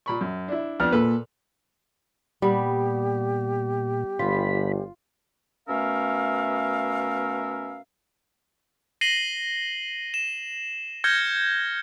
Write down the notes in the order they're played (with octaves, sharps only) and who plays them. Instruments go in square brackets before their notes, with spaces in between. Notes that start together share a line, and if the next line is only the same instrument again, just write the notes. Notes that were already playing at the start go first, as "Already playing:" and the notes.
[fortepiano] A#2 B5 C#6
F#2
D4 E4
[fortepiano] F2 B3 D4 [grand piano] F6
[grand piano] A#2 [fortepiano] A4 B4
[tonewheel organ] A#2 [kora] G3 B3 [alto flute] G4
[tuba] G1 [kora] F4 [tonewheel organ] B5
[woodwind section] B2 A3 C#4 A#4 E5 F5
[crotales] A#6 C7 D#7 F#7 G7
E7
F6 G6 G#6 A#6 C#7 G7